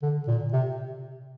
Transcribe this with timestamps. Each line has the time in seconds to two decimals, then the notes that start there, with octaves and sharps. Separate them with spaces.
0.03 D3
0.28 A#2
0.53 C3